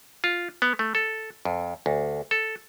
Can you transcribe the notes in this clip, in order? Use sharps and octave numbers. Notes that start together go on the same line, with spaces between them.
F4
B3
A3
A4
F2
D2
A4